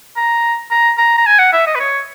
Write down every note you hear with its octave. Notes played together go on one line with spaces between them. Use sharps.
A#5
A#5
A#5
A#5
G#5
F#5
E5
D#5
B4
C#5